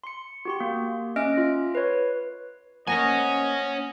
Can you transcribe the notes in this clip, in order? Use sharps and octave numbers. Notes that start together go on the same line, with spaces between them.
C6 C#7
F#4 G4 C6
A#3
C#4 D#5 E5 F6 A#6 D7
F4
B4 C#5
A#3 C5 C#5 D#5 F#5 G#5 A#6